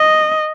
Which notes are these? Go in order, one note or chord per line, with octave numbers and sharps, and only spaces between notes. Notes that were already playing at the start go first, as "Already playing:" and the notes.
Already playing: D#5